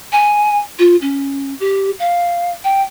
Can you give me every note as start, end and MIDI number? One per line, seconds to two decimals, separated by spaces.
0.12 0.59 80
0.78 0.96 65
1.01 1.53 61
1.60 1.90 67
1.99 2.51 77
2.64 2.82 79